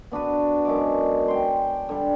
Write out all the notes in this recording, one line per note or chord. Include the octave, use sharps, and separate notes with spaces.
B3 D4 F#4 B4
F#2 G#3 D6
G5 C6
D3 G3